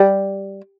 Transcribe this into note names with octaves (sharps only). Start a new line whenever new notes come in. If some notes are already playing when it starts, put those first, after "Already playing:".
Already playing: G3